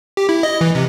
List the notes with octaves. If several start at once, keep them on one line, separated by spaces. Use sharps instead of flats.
G4
E4
D#5
E3
C3